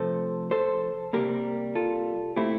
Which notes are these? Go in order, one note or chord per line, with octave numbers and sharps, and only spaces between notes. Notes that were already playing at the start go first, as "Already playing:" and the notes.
Already playing: C3 F3 A3 A4 C5
A4 C5
C3 G3 A#3 G4 A#4
F4 A4
A#2 A3 C4 E4 G4